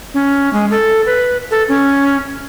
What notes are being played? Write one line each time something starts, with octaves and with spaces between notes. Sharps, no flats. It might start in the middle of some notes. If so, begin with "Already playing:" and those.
C#4
G#3
A4
B4
A4
C#4